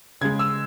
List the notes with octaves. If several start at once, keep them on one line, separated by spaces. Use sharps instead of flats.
C#3 G#3 G#6
E6